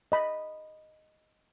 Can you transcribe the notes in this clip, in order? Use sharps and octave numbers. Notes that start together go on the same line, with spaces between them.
D#5 B5